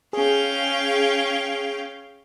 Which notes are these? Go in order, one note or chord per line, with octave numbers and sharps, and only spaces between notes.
C#4 G#4 F5 G5